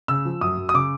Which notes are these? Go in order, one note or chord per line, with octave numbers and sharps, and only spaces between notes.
C#3 E6
F3
F#2 D#6
F#2
D#6
C#3 D6